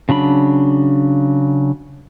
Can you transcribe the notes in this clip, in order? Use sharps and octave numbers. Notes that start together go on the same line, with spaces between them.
C#3 F#3 D4 B5